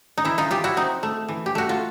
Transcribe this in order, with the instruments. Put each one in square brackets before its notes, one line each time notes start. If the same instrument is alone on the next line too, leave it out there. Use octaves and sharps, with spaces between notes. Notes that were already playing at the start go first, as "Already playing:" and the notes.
[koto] D#4
E3 E4
D#4 F4
E3 F4 G4
E4 F#4
C4 D#4
A3
E3
G4
A3 F#4
F4